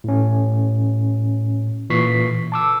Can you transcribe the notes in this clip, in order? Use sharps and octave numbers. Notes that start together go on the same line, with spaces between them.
A2 C#4
A#2 E3 C#6 B6 C7
A5 D6 E6